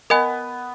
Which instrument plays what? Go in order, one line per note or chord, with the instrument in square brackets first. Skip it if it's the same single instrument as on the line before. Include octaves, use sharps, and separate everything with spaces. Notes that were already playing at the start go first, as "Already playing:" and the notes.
[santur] B3 [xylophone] A#4 D#5 G#5